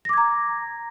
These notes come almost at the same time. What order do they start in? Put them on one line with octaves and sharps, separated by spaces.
A#6 D6 G#6 A#5